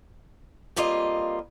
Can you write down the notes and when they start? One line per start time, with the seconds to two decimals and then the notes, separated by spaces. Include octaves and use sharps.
0.76 F2 G3 A#3 F4 D#5